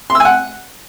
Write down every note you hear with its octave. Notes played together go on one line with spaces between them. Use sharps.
C6
E6
G#5
F#5